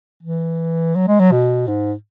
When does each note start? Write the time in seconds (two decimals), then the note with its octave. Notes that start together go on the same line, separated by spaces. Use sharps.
0.23 E3
0.96 F#3
1.08 G#3
1.19 F#3
1.31 B2
1.68 G#2